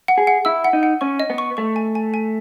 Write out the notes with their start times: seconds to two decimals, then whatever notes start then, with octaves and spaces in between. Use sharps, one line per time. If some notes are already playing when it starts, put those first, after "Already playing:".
0.08 F#5
0.18 G#4
0.27 F#5
0.45 E4 E6
0.64 F#5
0.73 D#4
0.83 F#5
1.01 C#4 C#6
1.20 D#5
1.30 B3
1.38 C#6
1.57 A3 C#6
1.76 G#5
1.95 G#5
2.14 G#5